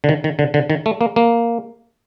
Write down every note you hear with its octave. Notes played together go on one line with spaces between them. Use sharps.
D3
D#3
D#3
D3
D3
D#3
A3
A#3
A#3